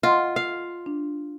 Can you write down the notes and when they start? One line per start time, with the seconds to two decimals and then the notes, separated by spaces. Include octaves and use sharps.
0.03 F4 D#5 F#5 C6
0.36 F5
0.86 D4